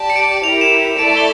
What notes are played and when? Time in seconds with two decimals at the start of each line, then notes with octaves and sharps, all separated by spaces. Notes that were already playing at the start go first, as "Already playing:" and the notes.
Already playing: G4 D5 A5
0.10 C#7
0.16 D7
0.44 E4 G4 A#4 F7
0.61 E7
0.98 A3 E4 A4 D5 A5 D7
1.17 G7